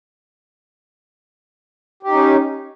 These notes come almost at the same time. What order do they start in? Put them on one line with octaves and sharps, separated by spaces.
G4 D#4 C#4